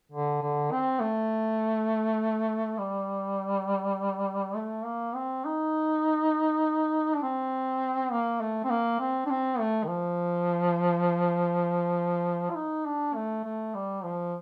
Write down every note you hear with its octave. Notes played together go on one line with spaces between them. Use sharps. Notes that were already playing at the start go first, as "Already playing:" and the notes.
D3
D3
C4
A3
G3
A3
A#3
C4
D#4
D4
C4
A#3
A3
C4
A#3
C4
D4
C4
A3
D#3
F3
F4
D#4
D4
A3
A3
G3
F3